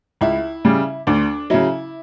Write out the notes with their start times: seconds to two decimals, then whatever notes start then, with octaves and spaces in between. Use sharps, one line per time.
0.21 C#2 E4
0.65 C#3 G3
1.07 D2 D4
1.50 C#3 F#3 E4